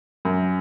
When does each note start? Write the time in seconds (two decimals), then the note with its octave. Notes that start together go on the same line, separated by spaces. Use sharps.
0.25 F#2